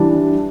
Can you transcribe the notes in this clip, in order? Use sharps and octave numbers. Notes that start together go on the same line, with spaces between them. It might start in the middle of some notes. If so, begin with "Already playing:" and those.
Already playing: E3 G3 D4